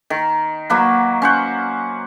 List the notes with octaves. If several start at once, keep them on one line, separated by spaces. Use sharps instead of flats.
D#3
F#3 A#3 B4
C#4 C5 F#5